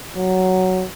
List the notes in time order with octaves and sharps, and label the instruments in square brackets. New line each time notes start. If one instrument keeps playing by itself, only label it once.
[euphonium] F#3